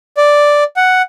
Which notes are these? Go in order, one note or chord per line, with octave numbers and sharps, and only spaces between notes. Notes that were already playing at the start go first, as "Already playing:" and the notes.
D5
F#5